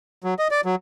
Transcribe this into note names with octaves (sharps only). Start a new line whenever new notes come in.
F#3
D#5
D5
F#3